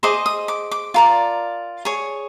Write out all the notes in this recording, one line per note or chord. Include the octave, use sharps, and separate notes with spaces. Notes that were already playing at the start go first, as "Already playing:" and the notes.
G#4 C5 D#5 D6
D#6
D6
D6
F4 A#4 D5
G#4 C#5